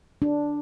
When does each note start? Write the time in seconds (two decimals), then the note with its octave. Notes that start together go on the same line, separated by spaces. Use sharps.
0.22 D4